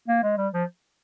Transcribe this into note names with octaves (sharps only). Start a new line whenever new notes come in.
A#3
G#3
G3
F3